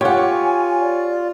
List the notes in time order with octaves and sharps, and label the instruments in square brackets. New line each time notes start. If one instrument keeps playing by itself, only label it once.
[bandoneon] F4 [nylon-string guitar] G4 F#5 [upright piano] C#5 [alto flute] G#5
[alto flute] D5